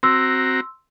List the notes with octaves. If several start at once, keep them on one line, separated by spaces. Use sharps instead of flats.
C4 F#4 A#5 C6 E6